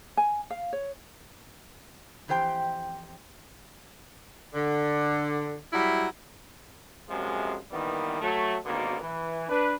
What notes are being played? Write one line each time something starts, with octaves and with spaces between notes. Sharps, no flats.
G#5
F5
C#5
F2 E3 G4 C5 G5
D3
F#3 G3 E4
F#2 C3 F3 G#3
D#3 E3 G3 A#3 B3
F#3 A3
G#1 B2 D3 D#3 A#3
E3
D4 B4